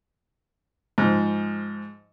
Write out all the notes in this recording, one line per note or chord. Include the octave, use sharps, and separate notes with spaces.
G#2 F3